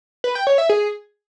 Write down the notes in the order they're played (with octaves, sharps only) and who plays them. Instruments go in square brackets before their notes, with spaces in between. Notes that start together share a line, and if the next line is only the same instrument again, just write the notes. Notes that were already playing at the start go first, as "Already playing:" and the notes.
[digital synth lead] B4
G5
C#5
E5
G#4